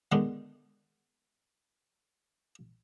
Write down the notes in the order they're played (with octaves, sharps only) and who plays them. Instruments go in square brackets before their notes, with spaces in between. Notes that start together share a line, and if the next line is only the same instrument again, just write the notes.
[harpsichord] D3 D#3 G#3 B3 D4